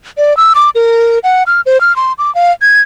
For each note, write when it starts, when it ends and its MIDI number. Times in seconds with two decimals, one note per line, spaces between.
0.18 0.36 74
0.37 0.53 88
0.55 0.70 86
0.75 1.19 70
1.24 1.43 78
1.47 1.61 89
1.66 1.80 72
1.81 1.95 89
1.96 2.13 84
2.18 2.33 86
2.35 2.51 77
2.62 2.82 92